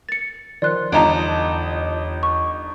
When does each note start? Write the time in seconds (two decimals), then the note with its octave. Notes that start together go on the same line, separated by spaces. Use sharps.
0.09 A6 C#7
0.62 D#3 F3 D5 C6 F#6
0.92 G1 E2 D#4 F4 A5 A#5 D7
2.23 C#6